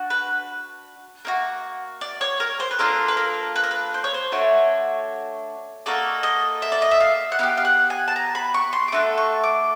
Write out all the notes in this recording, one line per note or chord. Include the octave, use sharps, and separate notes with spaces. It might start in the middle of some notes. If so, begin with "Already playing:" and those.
Already playing: D4 F#4
B4
A#3 D#4 F#4
D5
C#5
A#4
C5
B4
A#3 D4 F4 A4 A#4
B4
A#4
B4
A#4
B4
C5
C#5
C5
A3 D4 F#4 C#5
A#3 D#4 F#4 A4 D5
D#5
E5
D5
D#5
E5
F5
F#5
B3 E4 G4 F5
F5
F#5
G#5
A5
A#5
B5
C#6
C6
D6
A3 D4 F#4 A4 C#6
C#6
D6